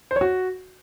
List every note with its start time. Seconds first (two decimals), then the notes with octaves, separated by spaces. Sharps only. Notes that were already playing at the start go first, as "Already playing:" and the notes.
0.11 C5
0.16 C#5
0.21 F#4